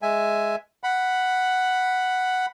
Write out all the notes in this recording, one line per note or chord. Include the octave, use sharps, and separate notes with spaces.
G#3 E5 G#5
F#5 B5